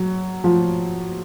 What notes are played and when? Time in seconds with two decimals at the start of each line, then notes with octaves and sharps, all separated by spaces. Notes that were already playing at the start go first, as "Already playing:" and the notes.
Already playing: F#3
0.44 F3